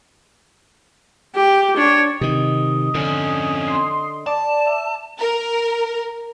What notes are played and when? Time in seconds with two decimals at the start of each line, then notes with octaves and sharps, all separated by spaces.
1.35 G4
1.76 D4 C#5
2.21 C3 D#3 D#5
2.95 F2 D3 C#4
3.67 C6
4.27 D5 A5
4.66 E5
5.19 A#4